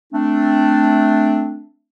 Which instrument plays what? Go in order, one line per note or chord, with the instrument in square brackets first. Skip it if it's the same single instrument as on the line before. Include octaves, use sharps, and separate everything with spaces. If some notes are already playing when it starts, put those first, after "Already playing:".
[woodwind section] A3 C4 D4